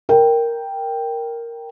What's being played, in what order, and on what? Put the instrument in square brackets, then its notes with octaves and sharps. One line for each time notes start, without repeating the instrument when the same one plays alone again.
[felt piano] A#4 G5